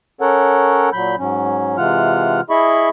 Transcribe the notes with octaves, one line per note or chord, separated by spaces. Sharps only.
C#4 A4 A#4 C#5 F#5
A#2 F#3 B5 G6
G#2 F#3 C#4
C3 E3 G#3 F4 F#5 F6
E4 G#4 D#5 E5 B5 C#6